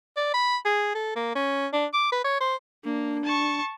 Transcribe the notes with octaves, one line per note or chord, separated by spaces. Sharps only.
D5
B5
G#4
A4
A#3
C#4
D4
D6
B4
C#5
C5
A#3 D4
A5 C#6